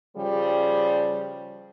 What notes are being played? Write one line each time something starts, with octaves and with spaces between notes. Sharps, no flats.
C#3 F3 G3